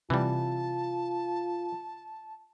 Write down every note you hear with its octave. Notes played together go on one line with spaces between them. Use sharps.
C3 E3 G3 F4 A5